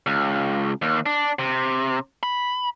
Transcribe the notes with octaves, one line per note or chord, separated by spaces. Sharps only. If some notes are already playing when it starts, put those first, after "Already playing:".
C#2
D#2
D4
C3
B5